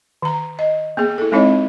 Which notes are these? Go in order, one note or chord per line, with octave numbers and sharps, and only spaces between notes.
D#3 A#5
D#5
A#3 B3 G#4
E4 A4
G#3 C4 D#4 E4 C#5 D#5